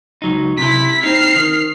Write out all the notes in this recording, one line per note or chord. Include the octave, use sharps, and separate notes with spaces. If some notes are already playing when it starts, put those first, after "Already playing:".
C#2 F#3 D#4
C3 E4 B6
C4 D#4 F6 C7
D#3